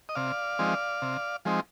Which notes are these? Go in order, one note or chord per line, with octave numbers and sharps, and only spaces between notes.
D#5
C3 D5 F5
F3 G#3 C4 D#4
C3
F3 G#3 C4 D#4